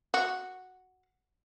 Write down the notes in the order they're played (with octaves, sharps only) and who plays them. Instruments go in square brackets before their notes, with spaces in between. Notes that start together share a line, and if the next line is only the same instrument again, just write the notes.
[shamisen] F#4